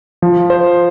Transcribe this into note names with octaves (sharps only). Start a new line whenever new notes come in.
F3
C5